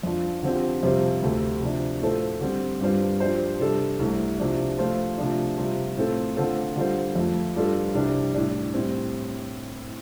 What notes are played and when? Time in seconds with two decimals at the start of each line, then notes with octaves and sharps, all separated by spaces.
0.03 F2 F3 D4 F4
0.43 D3 F3 C4 G4
0.83 F2 C3 G3 F4 C5
1.22 D2 C3 A3
1.62 C3 F3 D4
2.01 A2 A3 F4 A4 C5
2.41 D3 G3 C4
2.81 G2 G3 D4 F4 C5
3.20 F3 D4 G4 C5
3.59 C3 G3 D4 A4
3.99 C2 C3 A3
4.39 C3 F3 D4
4.79 F3 A3 F4 C5
5.18 C3 F3 A3 D4
5.57 C3 G3 F4
5.97 A2 A3 C4 F4 A4
6.37 D3 A3 F4 A4 C5
6.76 D3 G3 F4 A4 C5
7.15 F2 F3 A3
7.55 G2 G3 D4 F4 A4
7.95 C2 C3 G3 D4 G4
8.34 A2 G3 D4
8.74 A2 G3 C4